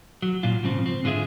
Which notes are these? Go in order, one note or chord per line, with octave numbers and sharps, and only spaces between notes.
F#3
A#2 F#3 F4
G#2 C#3 F3 C4
C4
G#2 D3 F4 G#4 E5